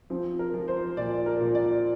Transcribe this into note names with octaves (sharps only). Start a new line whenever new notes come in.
F3 C4
A#4
F3
C5
A#2 D5
A#4
A#2
D5